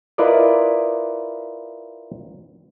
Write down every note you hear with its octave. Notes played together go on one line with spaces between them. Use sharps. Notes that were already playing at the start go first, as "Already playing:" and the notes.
E4 F4 A#4 B4 D5 D#5